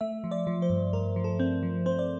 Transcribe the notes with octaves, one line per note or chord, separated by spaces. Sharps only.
A3 E5
F3
D5
F3
C5
G2
G2 A#4
F3
A4
C4
F3
C4 C5
D5